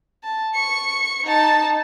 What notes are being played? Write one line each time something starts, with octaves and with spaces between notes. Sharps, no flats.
A5
C#6 C#7
D#4 A5